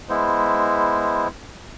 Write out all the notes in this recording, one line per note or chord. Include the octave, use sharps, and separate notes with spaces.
G#3 B3 E4 C5